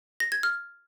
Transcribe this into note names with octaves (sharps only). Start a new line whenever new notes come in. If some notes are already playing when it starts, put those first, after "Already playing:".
A#6
G#6
F6